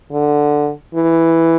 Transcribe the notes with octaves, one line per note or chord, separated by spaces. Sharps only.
D3
E3